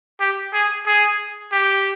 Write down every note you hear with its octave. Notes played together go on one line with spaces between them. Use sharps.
G4
G#4
G#4
G4